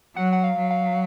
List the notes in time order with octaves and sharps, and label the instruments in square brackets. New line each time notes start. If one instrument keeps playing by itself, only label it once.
[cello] F#3 [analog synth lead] F#5
[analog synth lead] F#5
F5
[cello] F#3
[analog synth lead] F5